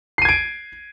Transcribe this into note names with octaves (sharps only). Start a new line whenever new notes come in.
G#6 C7 D7 D#7